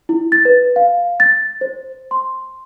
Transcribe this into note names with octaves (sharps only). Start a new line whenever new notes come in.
E4
A6
B4
F5
A6
C5
C6